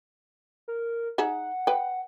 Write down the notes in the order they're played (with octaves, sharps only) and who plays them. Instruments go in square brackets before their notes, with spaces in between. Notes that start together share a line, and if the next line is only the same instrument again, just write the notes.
[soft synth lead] A#4
[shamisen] D#4 G#4 E5 [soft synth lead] F#5
[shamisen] B4 G5